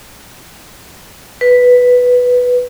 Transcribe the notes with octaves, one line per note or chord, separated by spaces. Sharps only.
B4